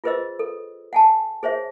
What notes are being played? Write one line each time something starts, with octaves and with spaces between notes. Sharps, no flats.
F4 G#4 B4 C5 D#5 E6
A4
F#5 G#5 A5
G#4 C5 C#5 E5